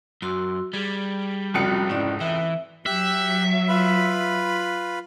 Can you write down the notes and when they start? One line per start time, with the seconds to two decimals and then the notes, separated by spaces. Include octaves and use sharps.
0.22 F#2 F#4 C6 E6
0.73 G3 G#4
1.54 F1 C#2 F#4 C#7
1.89 G#2 C#4 E4 D5
2.20 E3 E5
2.86 F#3 G4 E5 F#6
3.68 F4 B4 B5